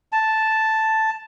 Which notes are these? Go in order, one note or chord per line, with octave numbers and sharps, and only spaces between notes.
A5